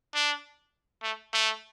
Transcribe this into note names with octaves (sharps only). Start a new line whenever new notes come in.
D4
A3
A3